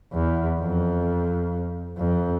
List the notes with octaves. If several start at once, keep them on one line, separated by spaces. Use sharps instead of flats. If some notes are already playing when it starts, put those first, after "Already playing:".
E2
F2
F2